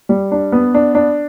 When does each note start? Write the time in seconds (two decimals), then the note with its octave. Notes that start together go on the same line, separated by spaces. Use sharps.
0.09 G3
0.32 D4
0.52 B3
0.74 D4
0.95 D4